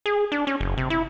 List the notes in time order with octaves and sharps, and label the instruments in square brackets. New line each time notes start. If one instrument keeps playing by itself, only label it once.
[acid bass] G#4
D4
C#4
F#1
C3
E4